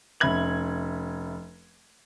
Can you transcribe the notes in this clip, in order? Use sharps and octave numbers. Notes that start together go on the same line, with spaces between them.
F1 C#4 E5 B5 G#6 F#7